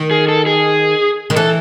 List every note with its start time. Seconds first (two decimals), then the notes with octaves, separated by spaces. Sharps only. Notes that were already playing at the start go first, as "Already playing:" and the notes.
Already playing: D#3
0.11 G#4
0.29 A4
0.46 G#4
1.30 D#3
1.36 E3 A4